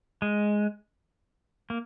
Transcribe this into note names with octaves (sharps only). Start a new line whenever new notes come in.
G#3
A#3